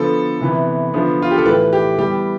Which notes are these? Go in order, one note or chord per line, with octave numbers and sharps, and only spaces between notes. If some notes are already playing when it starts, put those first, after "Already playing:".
Already playing: D3 F3 B3 A4
C3 E3 B3
D3 F3 B3
F4
G4
A4
A2 E3 A3 B4
G4
E3 G3 B3 G4